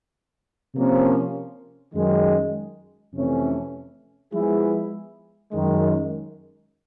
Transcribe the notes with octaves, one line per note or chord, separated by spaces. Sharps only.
C3 F3 A#3 C#4
F#2 D#3 G#3
F2 C3 E3 A3 C#4
F3 G#3 B3 E4 G#4
F#2 D#3 G#3